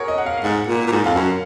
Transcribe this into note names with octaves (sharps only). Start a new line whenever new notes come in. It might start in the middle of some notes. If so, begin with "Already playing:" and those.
Already playing: F#4 G#4 A#4 C#5
D#5
F#5
F5
F5
G#2 F#5
A#2
A#2
G#2
F2 F5
F#2 F#5